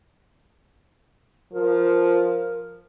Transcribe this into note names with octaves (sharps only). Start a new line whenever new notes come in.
F3 A#4